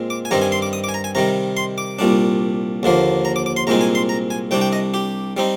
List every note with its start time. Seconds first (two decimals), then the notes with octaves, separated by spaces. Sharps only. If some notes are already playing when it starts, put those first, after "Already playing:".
Already playing: A#2 G#3 C4
0.10 D6
0.25 G#5
0.31 G2 D#3 G3 C4 A#5
0.41 G#5
0.52 C6
0.62 D6
0.73 D#6
0.84 D6
0.89 G#5
0.94 A#5
1.04 G#5
1.15 C3 D#3 G3 A#5
1.57 C6
1.78 D6
1.99 C2 A#2 G3 D4
2.83 D#2 D3 F3 A#3
3.25 A#5
3.36 D6
3.46 D6
3.57 C6
3.67 C2 A#2 G#3 C4 D#4 A#5
3.81 G#5
3.95 C6
4.09 A#5
4.30 G#5
4.51 C2 C3 G3 D4 G5
4.61 G5
4.73 D#5
4.94 G4
5.37 G3 C4 D#4